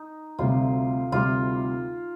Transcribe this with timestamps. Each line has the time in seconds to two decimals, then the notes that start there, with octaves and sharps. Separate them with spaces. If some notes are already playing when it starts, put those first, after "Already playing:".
Already playing: D#4
0.39 D2 C3 G3 F4
1.12 D2 C3 G3 F4